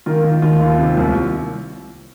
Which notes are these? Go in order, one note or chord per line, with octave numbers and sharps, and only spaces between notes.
D#3 F4 A#4
D#3
D#2 F4
D#2
C3
C2